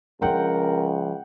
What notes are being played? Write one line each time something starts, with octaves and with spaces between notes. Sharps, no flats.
C#2 F3 C#4 A#4 F#5 G5